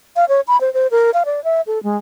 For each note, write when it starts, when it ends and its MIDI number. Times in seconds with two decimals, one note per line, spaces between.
0.16 0.25 77
0.29 0.41 73
0.48 0.59 83
0.61 0.72 72
0.74 0.87 72
0.91 1.11 70
1.14 1.23 77
1.25 1.43 74
1.44 1.61 76
1.67 1.82 69
1.83 1.97 56